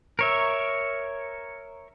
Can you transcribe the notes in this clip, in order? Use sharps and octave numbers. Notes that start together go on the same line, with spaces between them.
A#4 C#5 E5